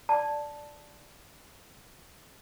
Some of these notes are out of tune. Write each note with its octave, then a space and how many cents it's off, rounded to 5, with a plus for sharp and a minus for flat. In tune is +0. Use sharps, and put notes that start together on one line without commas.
D5 +0 A5 +0